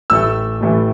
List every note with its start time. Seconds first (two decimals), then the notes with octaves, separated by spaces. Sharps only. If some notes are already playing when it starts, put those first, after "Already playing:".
0.10 A1 A2 E3 A3 E6
0.61 A1 A2 E3 A3